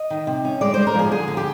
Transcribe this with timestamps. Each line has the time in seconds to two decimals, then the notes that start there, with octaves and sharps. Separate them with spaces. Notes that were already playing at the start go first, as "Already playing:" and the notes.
Already playing: D#5
0.10 D#3
0.27 C3
0.45 C#4
0.61 G#3 D5
0.74 G#3 C5
0.87 A#4
0.95 F3 G#4
1.11 D3 G#4
1.28 D3
1.37 G4